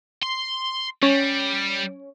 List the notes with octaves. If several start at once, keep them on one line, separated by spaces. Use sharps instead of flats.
C6
G3 C#4